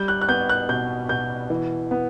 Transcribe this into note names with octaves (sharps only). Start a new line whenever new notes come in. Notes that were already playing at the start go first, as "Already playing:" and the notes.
Already playing: G3 G6
F#6
F#6
B3 G6
F#6
B2 G6
B2 G6
E3
B3